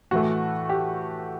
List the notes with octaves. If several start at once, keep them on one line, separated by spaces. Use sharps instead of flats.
A2 E3 A3 F#4
G4